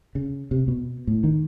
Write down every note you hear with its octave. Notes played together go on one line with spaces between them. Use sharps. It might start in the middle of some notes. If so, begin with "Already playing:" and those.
C#3
C3
B2
A2
D#3